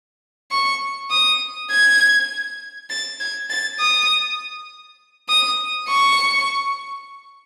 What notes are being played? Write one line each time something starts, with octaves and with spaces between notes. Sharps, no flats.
C#6
D#6
G#6
A6
G#6
A6
D#6
D#6
C#6